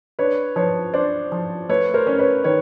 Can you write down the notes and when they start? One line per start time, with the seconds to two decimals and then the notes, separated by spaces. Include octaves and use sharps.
0.19 D4 B4 C#5
0.56 F3 B4 C#5
0.94 D4 C5 D5
1.32 F3
1.69 A3 B4 C#5
1.94 A#4 C5
2.07 C#4
2.19 B4 C#5
2.44 D#3 B4 C#5